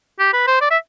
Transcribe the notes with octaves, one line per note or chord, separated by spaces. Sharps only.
G4
B4
C5
D5
E5